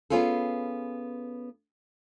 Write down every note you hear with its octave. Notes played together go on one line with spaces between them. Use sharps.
B3 C#4 F4 G#4 A4